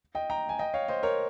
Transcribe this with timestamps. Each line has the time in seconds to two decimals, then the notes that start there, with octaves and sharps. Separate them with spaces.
0.15 D#5 G5
0.30 G5 A#5
0.49 G#5
0.59 D#5 G5
0.74 C#5 F5
0.88 C5 D#5
1.03 A#4 C#5